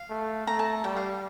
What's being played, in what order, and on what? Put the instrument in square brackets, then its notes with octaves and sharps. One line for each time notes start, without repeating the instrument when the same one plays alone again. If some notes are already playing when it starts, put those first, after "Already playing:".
Already playing: [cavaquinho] F5
[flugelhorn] A3
[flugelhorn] A3 [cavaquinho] A#5
[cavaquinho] A5
[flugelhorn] G3 [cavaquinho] G5
[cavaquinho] F5